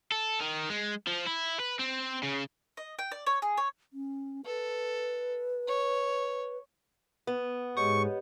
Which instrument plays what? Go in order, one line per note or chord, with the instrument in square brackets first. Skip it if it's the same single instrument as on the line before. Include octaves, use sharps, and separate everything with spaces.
[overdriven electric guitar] A4
D#3
G#3
F3
E4
B4
C4
C#3
[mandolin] D#5
G5
D5
C#5
G#4
C#5
[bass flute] C#4
[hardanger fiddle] A4 [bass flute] B4
[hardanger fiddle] C#5
[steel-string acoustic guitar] B3
[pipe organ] G#2 G#3 [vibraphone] G4 C#5 D#5 [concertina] C#6